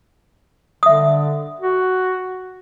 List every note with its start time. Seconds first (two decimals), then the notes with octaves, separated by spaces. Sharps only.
0.83 D3 E5 D#6
1.59 F#4